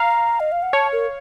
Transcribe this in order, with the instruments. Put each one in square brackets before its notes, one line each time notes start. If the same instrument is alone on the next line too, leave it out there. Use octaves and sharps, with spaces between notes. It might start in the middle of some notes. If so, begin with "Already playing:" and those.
Already playing: [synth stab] F5 [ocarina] A#5
[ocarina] D#5
F5
F#5
[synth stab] C#5 [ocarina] A5
[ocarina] A#4